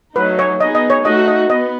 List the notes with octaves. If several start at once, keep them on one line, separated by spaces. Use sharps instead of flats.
F#3 A3 D#4 B4
C#5
B3 D#4 G#4 D#5
D#5
C#5
A3 D#4 F#4 D#5
D#5
B3 D#5